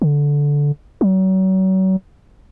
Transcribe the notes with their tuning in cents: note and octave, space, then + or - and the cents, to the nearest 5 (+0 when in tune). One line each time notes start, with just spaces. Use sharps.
D3 -15
F#3 +35